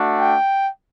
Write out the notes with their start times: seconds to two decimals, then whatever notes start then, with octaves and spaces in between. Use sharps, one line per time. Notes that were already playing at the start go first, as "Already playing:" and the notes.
Already playing: A3 D4 F#4
0.18 G5